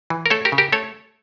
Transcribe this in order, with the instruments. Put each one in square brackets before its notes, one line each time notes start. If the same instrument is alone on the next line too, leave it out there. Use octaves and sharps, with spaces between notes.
[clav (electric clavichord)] E3
A#4
A3 A4 C#5
G4 A#4
C#3
G4 A#4
A3 A4 C#5